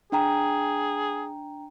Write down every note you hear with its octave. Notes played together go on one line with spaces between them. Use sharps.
D4 G#4 G5 A#5